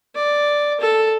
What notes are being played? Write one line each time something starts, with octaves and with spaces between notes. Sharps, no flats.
D5
A4